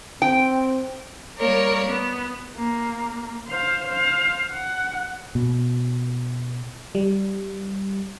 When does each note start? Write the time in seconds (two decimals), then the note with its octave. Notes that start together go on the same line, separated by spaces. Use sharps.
0.22 C4 G5
1.37 G3 A#3 A#4 C#5 D5
1.85 B3
2.56 A#3
3.48 C5 F5
3.88 C5 F5
4.51 F#5
5.35 B2
6.95 G3